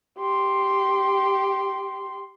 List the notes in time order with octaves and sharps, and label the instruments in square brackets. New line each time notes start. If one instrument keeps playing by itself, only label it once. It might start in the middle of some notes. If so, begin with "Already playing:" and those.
[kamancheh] G4 C6